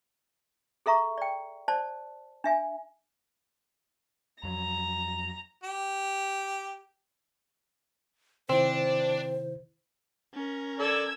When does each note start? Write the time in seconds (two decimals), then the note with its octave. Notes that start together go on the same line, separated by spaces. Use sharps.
0.86 G#4 A4 E5 A#5 C#6
1.18 D5 G5
1.68 C5 D5 A5
2.44 D4 E5 G#5
4.43 F2 F#3 A#5
5.64 G4
8.49 C3 D#3 C4 D4 E4 C5
10.33 C#4 A#4
10.79 A4 D5 E6 G#6